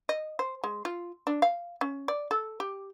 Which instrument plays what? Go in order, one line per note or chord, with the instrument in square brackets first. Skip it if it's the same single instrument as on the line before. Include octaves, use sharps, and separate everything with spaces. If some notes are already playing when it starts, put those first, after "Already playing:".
[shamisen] D#5
C5
G#3
F4
D4
F5
C#4
D5
A4
G4